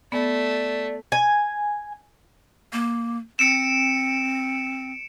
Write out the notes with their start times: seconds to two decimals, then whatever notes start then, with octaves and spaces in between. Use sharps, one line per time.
0.12 A3 B3 D5
1.12 G#5
2.73 A#3
3.39 C4 C#7 D7 E7